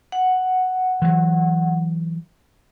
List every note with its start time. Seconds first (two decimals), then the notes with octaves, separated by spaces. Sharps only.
0.12 F#5
1.02 E3 F#3